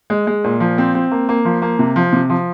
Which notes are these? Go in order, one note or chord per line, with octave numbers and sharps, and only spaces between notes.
G#3
G#3
A#2
F3
C4
C4
A#3
A#3
F3
A#3
C3
F3
C3
F3